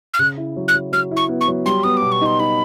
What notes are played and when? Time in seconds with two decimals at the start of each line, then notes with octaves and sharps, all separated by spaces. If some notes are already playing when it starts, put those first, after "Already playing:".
0.14 F6
0.19 C#3 F#6
0.37 E4
0.56 F#3
0.68 F#6
0.74 F#3
0.92 F#3 F6
1.11 E4
1.17 C#6
1.29 B3
1.41 C#6
1.48 F#3
1.66 G3 C6
1.84 B3 D#6
1.97 D6
2.02 B2
2.12 C#6
2.21 D#4 C6
2.40 D#4 B5